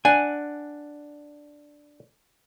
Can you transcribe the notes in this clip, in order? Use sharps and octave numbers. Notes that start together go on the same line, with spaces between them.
D4 F#5 G#5